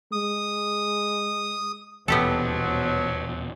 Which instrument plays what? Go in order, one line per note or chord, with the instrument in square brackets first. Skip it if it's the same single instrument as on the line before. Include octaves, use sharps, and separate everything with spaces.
[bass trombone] G#3 [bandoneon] D#6
[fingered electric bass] D#1 E2 [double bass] B2 [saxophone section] F3 F#3 [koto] B3 G4 A4